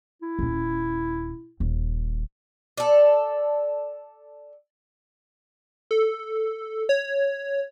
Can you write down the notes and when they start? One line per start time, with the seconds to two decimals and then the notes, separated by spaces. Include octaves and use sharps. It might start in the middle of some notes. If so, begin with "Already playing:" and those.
0.22 E4
0.39 D#1 C#4
1.60 D#1
2.78 A4 D5
5.91 A4
6.89 C#5